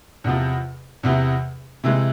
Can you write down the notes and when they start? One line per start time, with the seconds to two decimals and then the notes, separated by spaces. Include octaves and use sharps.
0.24 E2 C3 F3
1.03 E2 C3 E3
1.84 C3 E3 G#3